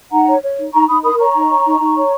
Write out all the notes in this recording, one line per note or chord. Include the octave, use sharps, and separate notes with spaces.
D#4 F#5 A#5
C#5
C#5
D#4
D#4 A#5 C#6
D#4 B5 D#6
A#4 B5 D#6
C#5 A#5 C#6
D#4
C#5
D#4
D#4
C#5